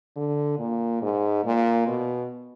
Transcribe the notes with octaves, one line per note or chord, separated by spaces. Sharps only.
D3
A#2
G#2
A#2
B2